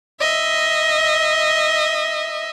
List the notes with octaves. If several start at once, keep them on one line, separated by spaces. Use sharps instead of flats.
D#5 E5